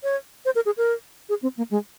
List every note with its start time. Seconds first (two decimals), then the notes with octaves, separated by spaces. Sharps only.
0.03 C#5
0.45 C5
0.55 A#4
0.66 G#4
0.77 A#4
1.29 G#4
1.43 C4
1.57 A#3
1.71 G#3